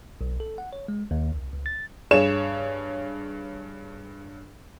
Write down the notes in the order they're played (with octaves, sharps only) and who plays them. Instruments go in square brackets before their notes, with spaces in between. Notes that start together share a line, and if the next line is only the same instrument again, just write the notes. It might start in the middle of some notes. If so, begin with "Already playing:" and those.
[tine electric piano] B1
A4
F#5
C#5
G#3
D#2
C2
C#2
A6
[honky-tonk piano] G2 G#4 C#5 E7